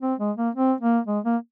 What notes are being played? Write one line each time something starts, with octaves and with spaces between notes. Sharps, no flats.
C4
G#3
A#3
C4
A#3
G#3
A#3